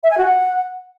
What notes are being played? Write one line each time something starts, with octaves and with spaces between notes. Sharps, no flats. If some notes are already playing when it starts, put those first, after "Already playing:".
E5
G#5
F#4
F#5